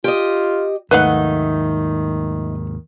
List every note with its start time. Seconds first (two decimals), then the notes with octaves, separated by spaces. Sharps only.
0.04 F4 G4 D#5
0.91 D#2 G#2 D#3 A3 D#4 B4 F5 F#5